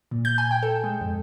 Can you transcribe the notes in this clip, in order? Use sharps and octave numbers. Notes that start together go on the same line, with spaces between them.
A#2
G6
G#5
G5
A4
G#3
F2